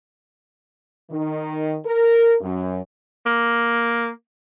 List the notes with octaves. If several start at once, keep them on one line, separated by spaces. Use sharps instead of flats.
D#3
A#4
F#2
A#3